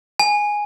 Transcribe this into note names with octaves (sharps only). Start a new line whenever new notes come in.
G#5